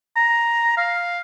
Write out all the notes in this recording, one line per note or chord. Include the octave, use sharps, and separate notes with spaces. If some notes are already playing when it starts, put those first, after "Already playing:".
A#5
F5